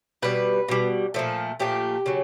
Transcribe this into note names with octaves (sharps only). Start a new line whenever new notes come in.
B2 G3 B4
B2 G3
A#2 F3 A3 A4
A#2 F3 A3 G4
C#3 F#3